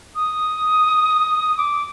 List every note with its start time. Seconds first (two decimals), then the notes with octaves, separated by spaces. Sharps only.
0.15 D#6
1.58 D6